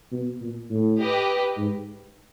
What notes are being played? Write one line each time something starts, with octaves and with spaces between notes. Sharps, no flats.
B2
A#2
A2
G4 B4 D#5
G#2